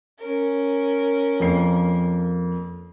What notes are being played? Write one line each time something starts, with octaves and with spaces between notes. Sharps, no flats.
C#4 A#4
F2 A#3 C7